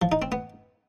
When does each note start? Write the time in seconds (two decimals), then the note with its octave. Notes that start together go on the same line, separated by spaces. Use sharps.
0.02 F3
0.12 D#4
0.22 C4
0.32 B3